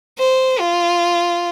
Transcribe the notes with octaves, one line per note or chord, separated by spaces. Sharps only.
C5
F4